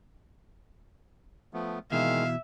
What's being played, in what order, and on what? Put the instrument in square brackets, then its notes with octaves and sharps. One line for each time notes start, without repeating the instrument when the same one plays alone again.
[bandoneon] F3 A3 B3
[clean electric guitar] B2 E3 [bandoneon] D#3 G#3 A#3 [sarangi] E5 [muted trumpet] F5